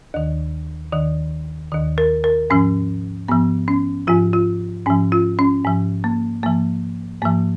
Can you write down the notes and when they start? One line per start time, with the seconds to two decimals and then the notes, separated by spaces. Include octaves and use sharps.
0.14 D#2 D#3
0.93 D#2 D#3
1.72 D#2 D#3
1.98 A#4
2.24 A#4
2.50 G#2 F3 C#4
3.28 G#2 F3 B3
3.68 C#4
4.07 G#2 F3 F4
4.33 F4
4.86 G#2 F3 C#4
5.12 F4
5.39 C#4
5.64 G#2 F3
6.04 A#3
6.43 G#2 F3 A#3
7.22 G#2 F3 A#3